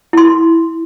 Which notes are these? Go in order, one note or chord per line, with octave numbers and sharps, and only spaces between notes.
E4 C6